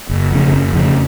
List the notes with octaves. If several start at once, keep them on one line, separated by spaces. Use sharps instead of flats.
F#1
F2 C#3
F#1
F2 C#3